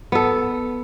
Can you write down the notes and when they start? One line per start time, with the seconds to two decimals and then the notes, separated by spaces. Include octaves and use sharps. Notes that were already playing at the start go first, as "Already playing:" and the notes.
0.12 B3 A4